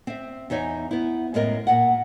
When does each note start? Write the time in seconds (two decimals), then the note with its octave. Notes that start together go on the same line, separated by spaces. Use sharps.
0.07 C4 E5
0.50 E2 D#4 C#5 E5 G#5
0.91 B3 E4
1.34 F#2 A2 G#3 B3 A#4 D#5
1.67 A#2 F#5